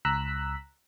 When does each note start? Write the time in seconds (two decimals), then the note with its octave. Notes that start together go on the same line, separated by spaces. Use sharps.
0.05 C#2 A#5 E6 F#6 B6